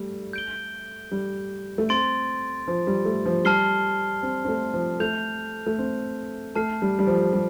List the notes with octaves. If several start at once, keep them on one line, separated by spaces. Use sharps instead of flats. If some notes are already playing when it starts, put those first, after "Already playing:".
Already playing: G3 A3
G6 D7 G7
G3
A3
C4 C6 A6 D7
F3
G3
A3
F3
G3 A5 F6 C7 G7
C4
C4
A3
F3
A3 G6 F7
A3
C4
A3 A5 F6 C7
G3
G3
F3
G3